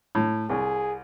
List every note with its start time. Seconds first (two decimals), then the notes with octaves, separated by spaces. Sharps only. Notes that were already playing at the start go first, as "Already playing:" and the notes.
0.15 A2
0.50 C2 G#4